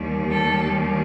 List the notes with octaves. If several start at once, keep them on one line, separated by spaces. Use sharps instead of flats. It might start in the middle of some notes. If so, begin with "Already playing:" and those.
Already playing: D#2 D#3 G3
A4